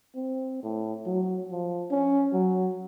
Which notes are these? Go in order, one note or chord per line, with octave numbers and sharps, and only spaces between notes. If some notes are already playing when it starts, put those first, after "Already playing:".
C4
A2
F#3
F3
C#4
F#3